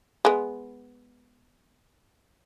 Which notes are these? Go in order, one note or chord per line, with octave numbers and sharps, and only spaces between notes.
G#3 B3